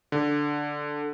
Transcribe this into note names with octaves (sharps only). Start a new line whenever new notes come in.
D3